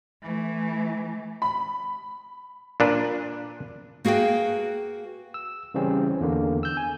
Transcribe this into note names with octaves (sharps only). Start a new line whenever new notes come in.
E3 A3
B5
A#2 D4 B4
A#3 F#4 G#4 B4 G5
E6
C#3 E3 G3 C4 C#4
E2 D3 A#3
E6 G6
G#5